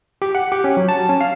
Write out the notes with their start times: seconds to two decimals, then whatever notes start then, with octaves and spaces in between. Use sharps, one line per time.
0.22 G4
0.35 F#5
0.52 G4
0.64 C#4
0.77 F#3
0.89 A5
1.09 C#4
1.21 F5